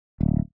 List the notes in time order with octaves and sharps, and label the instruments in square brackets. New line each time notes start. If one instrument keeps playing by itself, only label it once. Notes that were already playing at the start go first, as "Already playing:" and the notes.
[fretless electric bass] D1